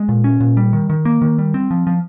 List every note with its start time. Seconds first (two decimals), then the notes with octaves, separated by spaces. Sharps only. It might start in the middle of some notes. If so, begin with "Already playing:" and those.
Already playing: G#3
0.09 A#2
0.24 C#4
0.40 A#2
0.57 G3
0.73 D#3
0.90 D#3
1.05 A#3
1.22 D#3
1.38 G3
1.54 C4
1.71 F3
1.87 F3